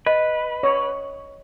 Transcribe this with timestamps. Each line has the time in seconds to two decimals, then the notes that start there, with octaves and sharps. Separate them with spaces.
0.06 B4 D#5
0.63 C#5